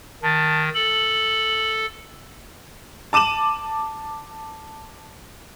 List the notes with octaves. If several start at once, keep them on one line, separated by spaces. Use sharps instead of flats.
D#3 A5
A4 F#7
A5 D6 D#7 E7 F#7